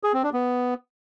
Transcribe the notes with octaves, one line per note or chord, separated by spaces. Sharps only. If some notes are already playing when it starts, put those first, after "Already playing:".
G#4
C4
D4
B3